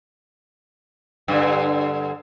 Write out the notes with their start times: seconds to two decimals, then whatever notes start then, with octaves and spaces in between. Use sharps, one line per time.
1.28 G2 D3